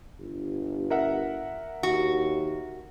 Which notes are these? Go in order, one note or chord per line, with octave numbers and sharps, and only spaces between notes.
G1
A#4 E5 F#5
D#2 F#4